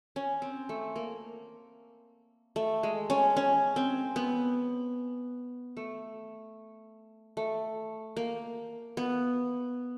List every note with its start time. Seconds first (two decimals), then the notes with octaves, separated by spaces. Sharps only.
0.16 C#4
0.42 C4
0.69 A3
0.96 A#3
2.56 A3
2.83 G#3
3.10 C#4
3.37 C#4
3.76 C4
4.16 B3
5.77 A3
7.37 A3
8.17 A#3
8.97 B3